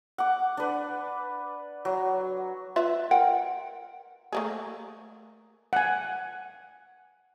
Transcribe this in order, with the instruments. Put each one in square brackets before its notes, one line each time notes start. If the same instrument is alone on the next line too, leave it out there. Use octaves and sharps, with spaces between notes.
[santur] F#5 D6
D4 B4
F#3
[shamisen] F4 B4 E5
A#4 F#5 G5
A3 A#3 G#4
[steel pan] F#5 G#5